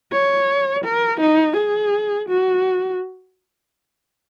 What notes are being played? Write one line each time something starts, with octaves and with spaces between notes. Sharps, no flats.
C#5
A#4
D#4
G#4
F#4